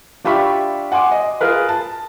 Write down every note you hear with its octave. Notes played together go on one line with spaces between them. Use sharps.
D4 F4 G4 E5 B5 C#6
F#5 G#5 C6 D6
D#5
F4 G#4 A#4 B4
A5